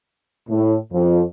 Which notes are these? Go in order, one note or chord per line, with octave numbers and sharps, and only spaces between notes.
A2
F2